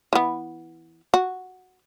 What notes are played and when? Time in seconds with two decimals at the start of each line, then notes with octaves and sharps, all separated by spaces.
0.13 E3 B3
1.14 F#4